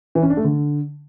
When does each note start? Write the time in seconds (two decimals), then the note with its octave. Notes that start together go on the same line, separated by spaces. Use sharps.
0.15 E3
0.23 C#4
0.30 D4
0.37 A3
0.44 D3